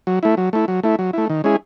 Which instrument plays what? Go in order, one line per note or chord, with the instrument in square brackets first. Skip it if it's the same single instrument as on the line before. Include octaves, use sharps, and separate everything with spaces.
[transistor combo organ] F#3
A3 E4
F#3
A3 E4
F#3
A3 E4
F#3
A3 E4
D#3
G#3 C#4 E4 G#4